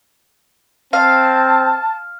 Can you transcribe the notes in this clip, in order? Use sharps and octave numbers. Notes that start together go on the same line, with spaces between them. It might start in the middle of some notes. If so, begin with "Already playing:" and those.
C4 F5 A5